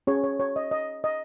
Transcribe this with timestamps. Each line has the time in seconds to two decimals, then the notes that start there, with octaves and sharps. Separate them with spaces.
0.07 C#4 G#4 C#5
0.24 C#5
0.40 C#5
0.56 D#5
0.71 D#5
1.04 D#5